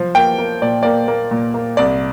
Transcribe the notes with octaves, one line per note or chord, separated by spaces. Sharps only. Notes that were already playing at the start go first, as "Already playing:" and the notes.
Already playing: F3
A#3 G5
A#3
A#2 D5
A#3 D5
A#3
A#2
A#3
C2 D5